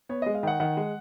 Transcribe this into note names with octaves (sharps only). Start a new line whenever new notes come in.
B3 C#5
G#3 D#5
F5
D#3 F#5
D#3 F#5
G#3